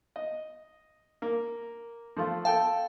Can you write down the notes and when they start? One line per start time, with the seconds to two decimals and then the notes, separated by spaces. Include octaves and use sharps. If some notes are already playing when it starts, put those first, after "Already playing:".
0.16 D#5
1.22 A#3
2.17 F3 A3 F4
2.45 A4 F5 G5 A5